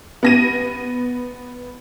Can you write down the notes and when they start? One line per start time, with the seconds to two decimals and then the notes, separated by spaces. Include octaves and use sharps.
0.23 B3 A#6 D#7